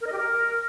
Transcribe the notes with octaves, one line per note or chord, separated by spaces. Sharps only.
A#4
D#5
G4
A#4